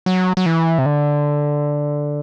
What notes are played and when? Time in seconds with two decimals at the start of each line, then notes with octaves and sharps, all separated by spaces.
0.06 F#3
0.37 F#3
0.46 E3
0.78 C3
0.85 D3